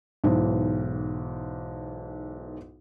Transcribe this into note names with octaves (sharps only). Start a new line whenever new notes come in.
B1 G#2 E3